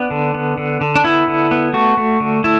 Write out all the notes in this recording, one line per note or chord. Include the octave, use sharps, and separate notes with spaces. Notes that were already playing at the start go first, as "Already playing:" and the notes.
Already playing: B3 D4
D3
B3
D3
D3
D4
B3 E4
D3
B3
A3 F#4
A3
D3
A3 E4